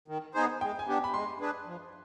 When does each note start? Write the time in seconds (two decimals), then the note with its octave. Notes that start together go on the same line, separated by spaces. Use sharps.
0.08 D#3
0.34 B3 D#4 G#4 C5
0.61 G#3 G5
0.79 G#5
0.88 B3 D4 G4
1.04 B5
1.14 G#3 C6
1.41 D4 G#4 B4
1.66 F3